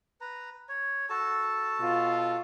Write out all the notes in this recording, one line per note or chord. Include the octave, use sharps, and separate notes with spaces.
B4 A#5
C#5
F#4 A4 A5
B2 F4